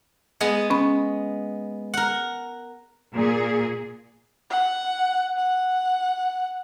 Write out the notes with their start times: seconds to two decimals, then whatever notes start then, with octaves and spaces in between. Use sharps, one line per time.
0.40 G#3 B3
0.70 C#4 B5
1.94 A#4 F#5
3.14 A#2 G#4
4.50 F#5
5.37 F#5